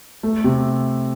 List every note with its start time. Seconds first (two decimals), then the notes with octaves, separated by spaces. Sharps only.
0.23 A3
0.44 C3